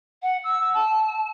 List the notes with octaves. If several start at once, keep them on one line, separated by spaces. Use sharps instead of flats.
F#5
E6
A5